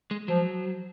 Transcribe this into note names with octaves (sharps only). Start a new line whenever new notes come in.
G#3
F3 F#3